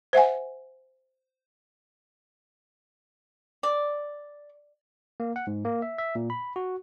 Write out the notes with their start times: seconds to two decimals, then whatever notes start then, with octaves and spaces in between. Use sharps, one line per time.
0.13 C5 E5 F#5 G#5
3.63 D5
5.20 A#3
5.36 F#5
5.47 G#2
5.65 A#3
5.82 E5
5.98 E5
6.15 A#2
6.30 B5
6.56 F#4